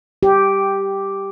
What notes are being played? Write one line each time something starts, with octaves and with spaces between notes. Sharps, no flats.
G4